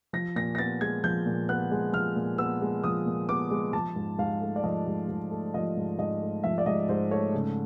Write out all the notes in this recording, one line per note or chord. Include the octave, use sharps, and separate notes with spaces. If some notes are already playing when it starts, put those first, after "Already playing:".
F3 A#6
A#2 A#6
A#6
B3 A6
G#3 G#6
F3 G6
A#2
B3 F#6
G#3
F3 F6
A#2
B3 E6
G#3
F3 D#6
A#2
B3 D6
G#3
F3 A5
G#2
G#2 F5
A3
D5
F3 D#5
G#2
G#2
A3
F3 D#5
G#2
G#2 D#5
A3
F3 E5
D5
G#2 D#5
G#2 C5
A3 C#5
C#3